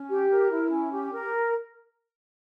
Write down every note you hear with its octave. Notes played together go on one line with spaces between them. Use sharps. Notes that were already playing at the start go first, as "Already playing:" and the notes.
Already playing: C#4
G4
A#4
E4
C#4
G4
A#4